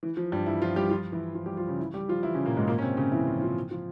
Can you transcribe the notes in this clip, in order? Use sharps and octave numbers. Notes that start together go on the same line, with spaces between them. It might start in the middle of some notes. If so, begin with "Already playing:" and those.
E3
F3
G2 G3
E3 E4
F3 F4
G3 G4
F3 F4
E3 E4
F3 F4
G3 G4
F3 F4
C#3 C#4
E3 E4
G3 G4
F3 F4
E3 E4
C#3 C#4
A#2 A#3
G#2 G#3
A#2 A#3
C#4
C3 C4
C#3 C#4
E3 E4
F3 F4
F3 F4
F3 F4